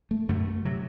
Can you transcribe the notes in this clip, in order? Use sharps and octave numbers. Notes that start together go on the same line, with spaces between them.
A3
F#2 D3 A3
C3 F#3